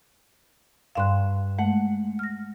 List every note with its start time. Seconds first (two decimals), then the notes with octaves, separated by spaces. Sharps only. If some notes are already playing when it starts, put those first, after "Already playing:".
0.95 G2 F5 C6 F#6 E7
1.58 G#3 A3 F#5
2.19 F6 A#6